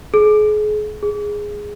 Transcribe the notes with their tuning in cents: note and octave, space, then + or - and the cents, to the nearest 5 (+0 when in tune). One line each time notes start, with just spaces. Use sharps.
G#4 +35
G#4 -5